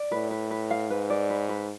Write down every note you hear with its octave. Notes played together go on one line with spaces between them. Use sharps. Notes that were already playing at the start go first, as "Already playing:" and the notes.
Already playing: D5
A2 B4
B4
B4
F5
G#2 B4
D5
B4
B4